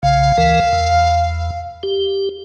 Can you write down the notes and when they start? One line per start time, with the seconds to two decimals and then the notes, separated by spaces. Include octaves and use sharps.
0.03 B1 C#3 F5
0.38 D2 E3 A#4
0.73 E2
1.83 G4